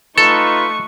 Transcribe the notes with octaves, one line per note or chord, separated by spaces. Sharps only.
A3 D#4 F4 A4 B4 C#6